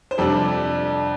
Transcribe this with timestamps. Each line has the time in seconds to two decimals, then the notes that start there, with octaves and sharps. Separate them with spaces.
0.11 C5
0.18 F2 C3 G3 D4 A4